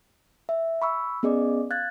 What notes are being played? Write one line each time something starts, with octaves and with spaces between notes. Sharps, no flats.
E5
B5 C#6 E6
B3 C#4 G#4 D5 D#5 D6
F5 F#6 G#6 A6